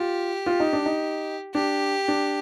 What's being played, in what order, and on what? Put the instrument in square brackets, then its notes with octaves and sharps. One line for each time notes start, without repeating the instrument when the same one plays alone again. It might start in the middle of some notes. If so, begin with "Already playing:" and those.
Already playing: [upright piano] F4 [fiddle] G4
[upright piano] F4
D#4
D4
D#4
[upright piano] D4 [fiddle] G4
[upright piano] D4